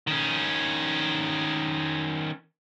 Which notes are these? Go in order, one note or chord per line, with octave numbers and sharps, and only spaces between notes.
D#3 C#4